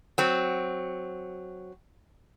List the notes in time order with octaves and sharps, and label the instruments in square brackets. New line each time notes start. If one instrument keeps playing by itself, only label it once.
[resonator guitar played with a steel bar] F#3 C4